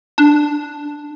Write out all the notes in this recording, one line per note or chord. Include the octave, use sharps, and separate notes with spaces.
D4